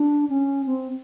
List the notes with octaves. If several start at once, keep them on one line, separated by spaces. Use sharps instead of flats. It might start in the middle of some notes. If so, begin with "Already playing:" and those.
Already playing: D4
C#4
C4